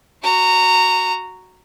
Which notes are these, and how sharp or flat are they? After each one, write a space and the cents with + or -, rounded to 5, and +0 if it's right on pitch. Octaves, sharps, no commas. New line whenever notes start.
F#4 +0 A#5 -15